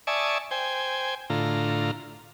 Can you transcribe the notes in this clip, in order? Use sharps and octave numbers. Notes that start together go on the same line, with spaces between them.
D5 E5 G#5 A5 C#6 D#6
C5 G5 G#5
A2 D3 F4 A#5